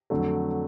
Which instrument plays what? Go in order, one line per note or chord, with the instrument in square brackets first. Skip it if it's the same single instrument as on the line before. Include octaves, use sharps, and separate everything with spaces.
[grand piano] F2 D3 F#3 A3